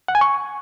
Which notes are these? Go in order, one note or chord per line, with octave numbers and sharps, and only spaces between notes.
F#5
G#5
C#6